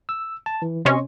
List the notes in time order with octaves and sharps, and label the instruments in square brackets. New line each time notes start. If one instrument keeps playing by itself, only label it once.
[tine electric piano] E6
A5
E3
[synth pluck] C3 C#4 [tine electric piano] D#5 C6 C#6